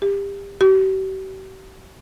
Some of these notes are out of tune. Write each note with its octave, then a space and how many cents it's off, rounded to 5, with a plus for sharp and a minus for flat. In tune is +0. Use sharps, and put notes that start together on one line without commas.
G4 +25
G4 -45